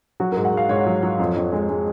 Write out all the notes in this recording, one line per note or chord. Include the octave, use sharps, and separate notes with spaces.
F#3 F#4
G#2 A#4
F#5
G#2 F5
G#2 C#5
F#3
F#3
F2
F2
G#3
G#3